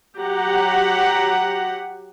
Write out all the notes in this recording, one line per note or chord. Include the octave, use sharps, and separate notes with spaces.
F#3 G4 F#5 A#5